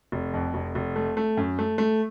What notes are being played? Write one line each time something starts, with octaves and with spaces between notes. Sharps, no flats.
F1
F2
F1
F1
A3
A3
F#2
A3
A3